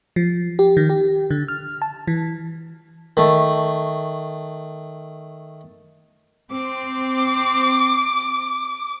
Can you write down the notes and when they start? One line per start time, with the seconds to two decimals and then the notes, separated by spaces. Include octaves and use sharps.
0.16 F3
0.59 G4
0.77 D#3
0.89 G4
1.31 D3
1.48 F6
1.82 A5
2.07 E3
3.17 D#3 A3
6.52 C4 D6